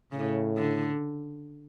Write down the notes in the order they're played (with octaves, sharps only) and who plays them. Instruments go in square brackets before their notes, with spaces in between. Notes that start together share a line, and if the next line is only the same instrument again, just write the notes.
[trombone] A2 [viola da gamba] C#3
[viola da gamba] D3